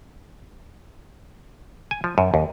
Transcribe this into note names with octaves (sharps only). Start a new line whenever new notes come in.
G#5
F3
F#2
D#2